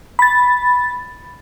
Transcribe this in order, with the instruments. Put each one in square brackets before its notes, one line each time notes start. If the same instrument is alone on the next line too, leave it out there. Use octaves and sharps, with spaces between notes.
[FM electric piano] B5 A6